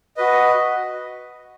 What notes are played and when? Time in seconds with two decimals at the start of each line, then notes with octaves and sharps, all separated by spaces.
0.17 F#4 B4 D#5